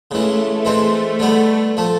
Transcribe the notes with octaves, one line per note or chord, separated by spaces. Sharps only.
C#3 E3 G#3 A3
E3 G#3 C4
D3 G3 B3
F3 A3